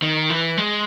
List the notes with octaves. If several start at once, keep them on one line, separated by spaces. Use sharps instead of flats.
D#3
E3
G#3